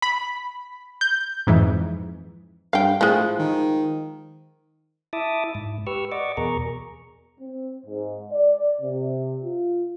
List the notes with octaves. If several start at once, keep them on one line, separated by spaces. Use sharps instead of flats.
B5
G6
F2 G#2 E3
G2 F5 G5
A2 F3 G#3
D#3
E4 E5 A5 D6 D#6
G#2
G4 B4 C#6 E6 F6
D5 D#5 F#5 C#6 D6
E2 B2 G#4 A#4 A#5 C#6
C4
G#2
D5
C3
F4